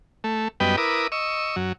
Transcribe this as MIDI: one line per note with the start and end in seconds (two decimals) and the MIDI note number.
0.24 0.48 57
0.60 0.76 42
0.60 0.76 55
0.60 0.76 59
0.60 0.76 71
0.60 0.76 75
0.60 0.76 79
0.77 1.07 64
0.77 1.07 70
0.77 1.07 71
0.77 1.07 86
0.77 1.07 87
1.12 1.56 75
1.12 1.56 85
1.12 1.56 88
1.56 1.73 42
1.56 1.73 54